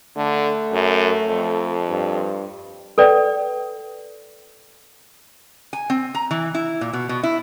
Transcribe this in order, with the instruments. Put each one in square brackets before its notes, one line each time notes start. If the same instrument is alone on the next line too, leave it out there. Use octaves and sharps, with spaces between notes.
[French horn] D3 [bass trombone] A3
[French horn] F#2
F2
[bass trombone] G2
[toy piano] A4 B4 D5 G5
[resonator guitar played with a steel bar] G#5
C4
A#5
E3
E4
A#2
B2
B2
E4